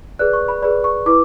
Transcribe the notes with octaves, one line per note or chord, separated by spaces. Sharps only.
G#4 B4 D5 F#6
C#6
B5
G#4 B4 D5 B5
C#6
E4 B4 D6